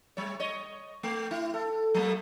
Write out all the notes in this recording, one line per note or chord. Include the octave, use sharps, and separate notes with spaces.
G3 C#5
C#5 D#5
A3
E4
A4
F#3 A3 A#3